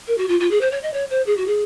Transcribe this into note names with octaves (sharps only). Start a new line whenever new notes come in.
A#4
F#4
F4
F4
G#4
C5
C#5
D#5
C#5
C5
G#4
F#4
G#4